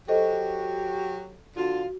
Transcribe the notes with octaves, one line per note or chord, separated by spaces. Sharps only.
F#3 F#4 G4 A4 C5 D#5
D3 F4 F#4